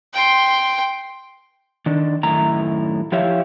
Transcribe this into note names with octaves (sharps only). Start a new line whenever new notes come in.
G5 C6
D#3 D4
F#2 A2 D#3 E4 A#5
F3 E4 G4 C#5 E5 F5